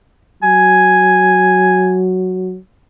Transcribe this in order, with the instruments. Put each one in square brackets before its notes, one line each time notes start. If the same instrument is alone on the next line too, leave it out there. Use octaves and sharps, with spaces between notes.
[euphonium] F#3 [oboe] G#5